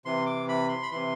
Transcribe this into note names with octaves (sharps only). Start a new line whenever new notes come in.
C3 E3 C6
D6
B5
C6
B5
C3 E3 C6